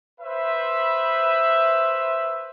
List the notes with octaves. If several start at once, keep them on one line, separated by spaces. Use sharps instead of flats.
B4 C5 E5